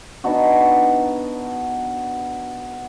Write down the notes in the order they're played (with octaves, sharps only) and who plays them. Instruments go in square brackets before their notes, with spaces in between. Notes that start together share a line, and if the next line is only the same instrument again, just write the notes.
[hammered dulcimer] B3 D4 D#4 F#4